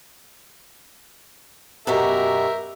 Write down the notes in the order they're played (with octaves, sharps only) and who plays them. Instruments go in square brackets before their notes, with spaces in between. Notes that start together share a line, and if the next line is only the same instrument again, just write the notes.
[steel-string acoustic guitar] F#2 B2 F#4 [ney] G4 [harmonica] A#4 [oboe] E5